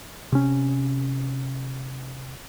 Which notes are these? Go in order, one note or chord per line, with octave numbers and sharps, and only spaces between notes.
C3 C#4